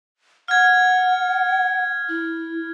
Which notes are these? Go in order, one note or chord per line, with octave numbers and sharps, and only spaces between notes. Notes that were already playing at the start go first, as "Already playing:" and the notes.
F#5 F6 G#6
E4